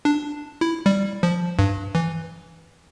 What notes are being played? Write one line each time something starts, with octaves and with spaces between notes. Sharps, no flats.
D4
E4
G3
F3
G2
E3